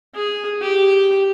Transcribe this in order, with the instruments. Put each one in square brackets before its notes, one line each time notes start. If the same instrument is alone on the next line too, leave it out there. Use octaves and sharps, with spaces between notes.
[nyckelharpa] G#4
G4